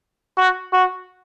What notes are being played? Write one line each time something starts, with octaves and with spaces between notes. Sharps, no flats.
F#4
F#4